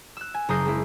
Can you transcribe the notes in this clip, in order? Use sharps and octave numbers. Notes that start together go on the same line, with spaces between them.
E6 F#6
G#5
F#1 A#5 D#6 G6 C7
G#3 C4 E4